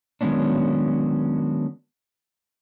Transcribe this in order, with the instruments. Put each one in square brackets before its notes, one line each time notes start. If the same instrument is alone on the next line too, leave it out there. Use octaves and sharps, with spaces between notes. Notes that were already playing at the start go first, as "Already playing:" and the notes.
[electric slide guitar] D#3 F#3 G#3 B3 C#4 D4